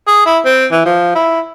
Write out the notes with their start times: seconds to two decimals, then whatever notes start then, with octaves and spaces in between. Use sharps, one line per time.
0.07 G#4
0.26 E4
0.45 C4
0.72 E3
0.85 F3
1.15 E4